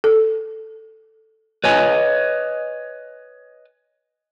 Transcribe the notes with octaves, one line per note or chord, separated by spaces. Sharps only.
A4
B4 C#5 D#5 G#5